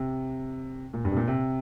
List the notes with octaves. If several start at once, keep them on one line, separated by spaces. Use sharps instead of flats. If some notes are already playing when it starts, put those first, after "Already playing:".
Already playing: C3
A#2
G2
C3
A#2
C3